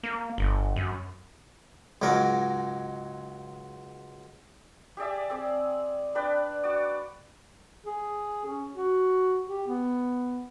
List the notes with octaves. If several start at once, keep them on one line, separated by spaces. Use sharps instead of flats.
A#3
G1
F#2
C#2 G#2 F#3 A#4
G4 G#4 D5 E5
C4 G#4 D5
D4 B4 D5 G5
F#4 D5
G#4
C#4
F#4
G4
B3